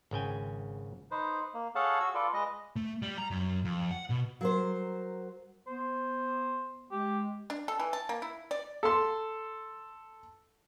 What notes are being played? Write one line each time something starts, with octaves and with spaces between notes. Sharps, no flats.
G#1 C#3 G5 G#5
D#4 B4 C5
A#3
G#4 A4 C#5 F5 F#5 A5
F#4 E6
F4 A4 B4 D5
G#3 B4 D#5
A3
G3
A#5
F#2
F2
F#5
B2
F#3 A#4 C5
B3 C5
G#3 G4
D4
A4
E3
A5
A#3
E4
D5
A4 C6